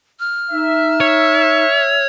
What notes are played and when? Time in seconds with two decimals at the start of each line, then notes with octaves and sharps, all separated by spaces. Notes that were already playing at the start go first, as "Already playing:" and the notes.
0.20 F6
0.51 D#4 E5
1.01 C#5